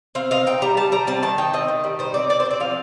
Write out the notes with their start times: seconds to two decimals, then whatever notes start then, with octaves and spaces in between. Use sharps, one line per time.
0.15 C4 F5
0.31 D#4 F5
0.47 D#4 G5
0.62 G3 A#5
0.77 G3 A5
0.92 G3 A#5
1.07 C4 A5
1.22 D#3 A5
1.38 D#4 G5
1.54 C4 D#5
1.68 D#3
1.84 G3
1.99 D#4 C5
2.14 C4 D5
2.29 C4 D5
2.40 C5
2.45 C4
2.51 D5
2.60 F3 F5